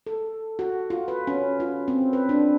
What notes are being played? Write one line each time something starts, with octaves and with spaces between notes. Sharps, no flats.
A4
F#4
F4
B4
C#4
F4
C4
B4
D4